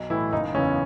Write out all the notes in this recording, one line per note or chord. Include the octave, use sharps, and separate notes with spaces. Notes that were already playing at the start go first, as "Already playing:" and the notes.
Already playing: B1
A2 E3 E4
F#1 D#4
E2 C#3 E3 C#4